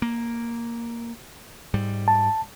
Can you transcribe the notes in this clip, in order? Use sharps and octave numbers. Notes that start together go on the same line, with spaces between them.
A#3
G#2 G3
A5